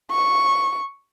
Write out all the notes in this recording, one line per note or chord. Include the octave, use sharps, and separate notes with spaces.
C#6